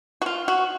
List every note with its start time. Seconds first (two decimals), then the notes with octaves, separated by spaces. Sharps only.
0.22 F#4
0.26 F4
0.48 F#4